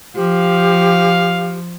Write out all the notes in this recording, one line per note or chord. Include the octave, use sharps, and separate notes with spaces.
F3 G4 F5